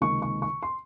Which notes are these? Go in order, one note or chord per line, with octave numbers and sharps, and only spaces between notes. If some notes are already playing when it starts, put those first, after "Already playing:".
C#2 C3 D#3 A#3 C#6
C#6
C#6
C6